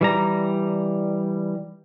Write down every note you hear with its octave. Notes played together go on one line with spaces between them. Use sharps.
E3 G3 A#5